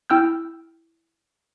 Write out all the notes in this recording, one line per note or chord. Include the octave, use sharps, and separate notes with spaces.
E4 G5 E6 F6 G6